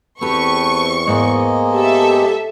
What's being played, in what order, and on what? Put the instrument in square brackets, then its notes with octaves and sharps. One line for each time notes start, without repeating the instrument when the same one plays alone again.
[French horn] E2 [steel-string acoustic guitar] C4 G4 [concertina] A4 B4 [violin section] C#6
[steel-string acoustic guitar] G#2 B3 [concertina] G#3 A#3 D#5
[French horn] G4 [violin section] A4 E5